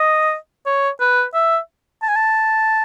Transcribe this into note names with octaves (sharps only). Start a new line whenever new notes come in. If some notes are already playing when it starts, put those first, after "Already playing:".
Already playing: D#5
C#5
B4
E5
A5
G#5
A5